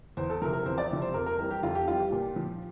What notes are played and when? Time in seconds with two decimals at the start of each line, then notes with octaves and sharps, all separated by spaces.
0.17 E2 C5
0.30 A4
0.42 C3 F3 A#4
0.53 A#4
0.66 E2 C5
0.78 D5
0.90 C3 F3
1.02 C5
1.14 F2 A#4
1.26 A#4
1.38 E3 G3 A#4
1.51 G4
1.63 F2 F4
1.75 G4
1.88 E3 G3 F4
1.99 G4
2.12 A#2
2.36 F3